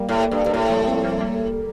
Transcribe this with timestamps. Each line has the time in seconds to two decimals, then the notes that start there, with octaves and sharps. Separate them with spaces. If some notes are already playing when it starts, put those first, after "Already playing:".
Already playing: G3 A#3
0.09 A2
0.31 G2
0.46 G2
0.53 A2 G3 A#3
0.70 F3 A3
0.87 A3 C4
1.03 G3 A#3
1.21 G3 A#3